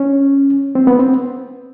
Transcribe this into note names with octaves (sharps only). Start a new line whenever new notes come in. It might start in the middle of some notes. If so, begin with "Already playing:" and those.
Already playing: C#4
C4
B3
C4